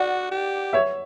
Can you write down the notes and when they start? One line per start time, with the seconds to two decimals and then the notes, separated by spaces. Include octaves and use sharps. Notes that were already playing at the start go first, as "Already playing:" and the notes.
Already playing: F#4 D5 F#5
0.31 G4
0.73 C#5 E5